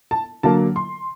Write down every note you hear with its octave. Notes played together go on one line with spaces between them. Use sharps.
A5
D3 F#3 A#3 A5
C6